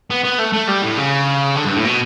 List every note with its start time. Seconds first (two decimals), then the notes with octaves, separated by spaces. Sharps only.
0.11 B3
0.25 B3
0.39 A3
0.54 A3
0.69 G3
0.83 A2
0.98 C#3
1.56 D3
1.65 G2
1.75 A2
1.85 B2